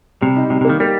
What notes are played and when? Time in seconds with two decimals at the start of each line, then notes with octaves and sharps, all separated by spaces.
0.21 C3 G3
0.36 D#4
0.50 C3 G3
0.61 C3
0.65 D#3 A#3
0.80 G3 A#3